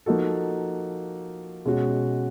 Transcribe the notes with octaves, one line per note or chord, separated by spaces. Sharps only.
F3 A#3 D#4 F#4 A4
B2 G#3 C#4 F#4